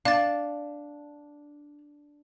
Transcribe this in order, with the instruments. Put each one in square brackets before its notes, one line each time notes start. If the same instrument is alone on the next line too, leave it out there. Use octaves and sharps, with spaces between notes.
[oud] D4 [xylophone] F5 A6